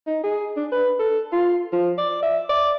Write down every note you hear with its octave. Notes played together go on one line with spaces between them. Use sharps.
D#4
G#4
D4
B4
A4
F4
F3
D5
E5
D5